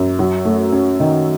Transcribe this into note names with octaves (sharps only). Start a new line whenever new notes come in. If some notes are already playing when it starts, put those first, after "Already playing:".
Already playing: F#2
F#3
A3
C#4
D#3